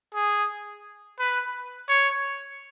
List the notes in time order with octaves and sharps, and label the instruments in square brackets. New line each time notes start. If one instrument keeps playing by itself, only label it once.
[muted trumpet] G#4
B4
C#5